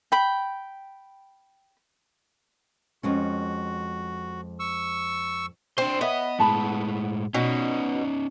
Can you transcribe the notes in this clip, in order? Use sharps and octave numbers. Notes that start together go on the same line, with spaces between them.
G5 B5
F2 G#3 C#4 F#4
C#6 E6
C4 D4 C5
B3 C#5 D#5 E5
A2 G#3 A5 B5
B2 C#4 D#4 F#4